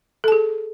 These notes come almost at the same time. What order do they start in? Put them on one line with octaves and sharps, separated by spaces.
A4 A5 G#4